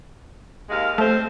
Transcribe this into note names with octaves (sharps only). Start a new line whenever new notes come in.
D#2 G#3 F5
A3 C4 A4 C5